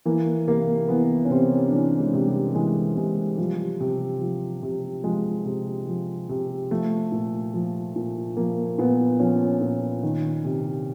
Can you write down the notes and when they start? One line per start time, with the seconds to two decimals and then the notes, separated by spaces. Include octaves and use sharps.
0.05 E3 A#3
0.47 C3 A#3
0.88 E3 B3
1.25 C#4
1.30 C3 C4
1.67 D4
1.72 E3 C#4
2.00 G#3
2.13 C3
2.27 G3
2.55 E3 G#3
2.96 C3 G#3
3.38 F3 G3
3.80 C3
4.21 F3
4.63 C3
5.04 F3 G#3
5.45 C3
5.88 F3
6.29 C3
6.71 F3 A3
7.12 A#2
7.54 F3
7.96 A#2
8.37 F3 A#3
8.78 A#2 B3
9.20 F3 C#4
9.61 A#2
10.03 D#3
10.45 C3